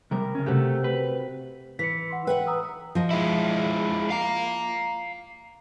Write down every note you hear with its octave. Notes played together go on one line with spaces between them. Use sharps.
C3 G3 A#4
C#3 C#4
C3 A3 F#4 G4
B4
E3 B6 C#7
F#5 C6
B4 E5 F#5 G5
A#5 D#6 E6
F3 D#5
G#3 E4
F5 A#5